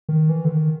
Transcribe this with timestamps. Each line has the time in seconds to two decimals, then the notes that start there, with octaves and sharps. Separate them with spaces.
0.09 D#3
0.29 E3
0.45 D3
0.50 D#3